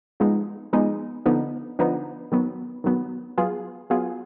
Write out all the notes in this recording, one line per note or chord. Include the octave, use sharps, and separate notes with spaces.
F3 G#3 B3 D#4
F3 G#3 B3 D#4
D3 F3 B3 D#4
D3 F3 B3 D#4
D#3 F#3 B3
D#3 F#3 B3
F#3 B3 F4 G#4
F#3 B3 F4 G#4